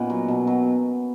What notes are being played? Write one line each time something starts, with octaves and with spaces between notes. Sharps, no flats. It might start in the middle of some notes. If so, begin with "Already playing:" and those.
Already playing: A#2 B3 C#4 D#4
F#3
B2
F#3